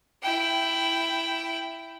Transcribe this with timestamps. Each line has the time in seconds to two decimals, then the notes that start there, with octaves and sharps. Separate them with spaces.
0.22 E4 G5